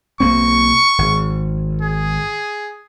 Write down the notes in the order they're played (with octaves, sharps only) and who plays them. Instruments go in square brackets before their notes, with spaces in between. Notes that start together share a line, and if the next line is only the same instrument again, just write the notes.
[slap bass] B1 A#3 C4 [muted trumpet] C#6
[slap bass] G#1
[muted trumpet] G#4